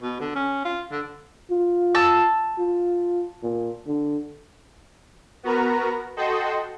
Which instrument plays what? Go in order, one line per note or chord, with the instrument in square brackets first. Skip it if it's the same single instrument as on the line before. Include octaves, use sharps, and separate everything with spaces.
[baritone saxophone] B2
D3
C#4
F4
D3
[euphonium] F4
[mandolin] A5 E6
[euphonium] F4
A#2
D3
[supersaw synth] B3 F#4 A#4 B4 A#5
F#4 A4 D#5 G5 C6